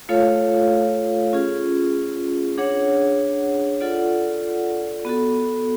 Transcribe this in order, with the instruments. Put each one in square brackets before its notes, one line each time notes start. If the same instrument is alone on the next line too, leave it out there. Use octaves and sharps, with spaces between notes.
[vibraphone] A3 F4 A4 C#5 F5
C#4 F4 G#4
D4 G#4 C#5 F#5
F4 A4 D5 F#5
B3 F#4 A4